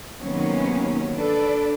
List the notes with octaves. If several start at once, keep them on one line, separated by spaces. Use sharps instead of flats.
C3 D#3 F#3 A#3 B3 C#4
D4 A4 B4 D5